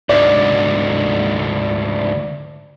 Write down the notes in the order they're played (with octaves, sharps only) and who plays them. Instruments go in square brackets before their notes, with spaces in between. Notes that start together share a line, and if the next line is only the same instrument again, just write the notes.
[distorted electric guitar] D2 G#2 [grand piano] D5